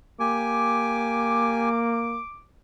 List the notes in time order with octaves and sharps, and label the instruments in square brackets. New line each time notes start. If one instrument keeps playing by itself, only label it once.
[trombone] A#3 [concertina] G4 G#5 [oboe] D6